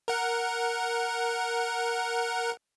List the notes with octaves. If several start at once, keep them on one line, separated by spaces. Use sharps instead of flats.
A#4 F#5